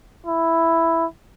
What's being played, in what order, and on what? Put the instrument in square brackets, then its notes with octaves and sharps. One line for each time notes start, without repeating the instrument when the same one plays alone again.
[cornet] E4